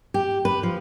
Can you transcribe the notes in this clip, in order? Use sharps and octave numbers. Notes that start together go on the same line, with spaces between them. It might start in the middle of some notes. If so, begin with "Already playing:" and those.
G4
B4
F3